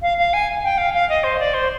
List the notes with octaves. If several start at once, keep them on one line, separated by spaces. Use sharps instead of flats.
F5
F5
G#5
G5
F5
F5
D#5
C5
D5
C5